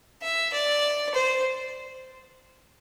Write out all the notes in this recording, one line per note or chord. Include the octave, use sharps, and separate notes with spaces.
E5
D5
C5